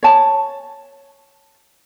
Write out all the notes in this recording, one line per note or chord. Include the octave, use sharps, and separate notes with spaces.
C#5 A5